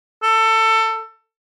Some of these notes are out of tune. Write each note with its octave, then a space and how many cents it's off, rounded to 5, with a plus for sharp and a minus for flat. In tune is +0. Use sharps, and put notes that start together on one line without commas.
A4 +20